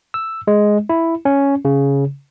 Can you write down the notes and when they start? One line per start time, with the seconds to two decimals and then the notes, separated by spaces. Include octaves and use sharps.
0.14 E6
0.47 G#3
0.89 E4
1.25 C#4
1.65 C#3